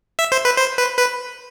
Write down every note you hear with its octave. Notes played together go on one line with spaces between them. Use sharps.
E5
C5
B4
C5
B4
B4